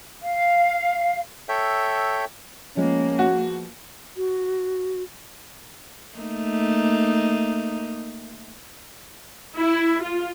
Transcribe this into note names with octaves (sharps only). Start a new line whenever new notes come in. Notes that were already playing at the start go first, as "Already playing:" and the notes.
F5
A4 C#5 E5 G5
F3 G#3 A#3 B3 C#4
F#4
F#4
A3 A#3 D#4
E4
F4